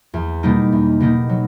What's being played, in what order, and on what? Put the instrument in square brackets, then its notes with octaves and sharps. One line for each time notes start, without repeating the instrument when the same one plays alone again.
[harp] E2
B2 G3 A#3 D#4
E2
B2 G3 A#3 D#4
F#3